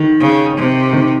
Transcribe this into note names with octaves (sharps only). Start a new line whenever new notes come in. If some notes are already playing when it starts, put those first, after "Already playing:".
Already playing: D#3
C#3
C3
D#3